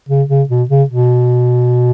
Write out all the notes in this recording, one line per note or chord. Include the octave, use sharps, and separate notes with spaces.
C#3
C#3
B2
C#3
B2